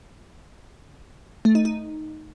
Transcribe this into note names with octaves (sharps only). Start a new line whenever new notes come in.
A3
D#4
D#4